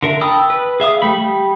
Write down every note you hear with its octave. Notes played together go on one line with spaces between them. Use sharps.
D3 A#4 E5
G5 A5 B5 D#6 E6
B4
G#4 E5 F5 D#6
G3 A3 B5
G3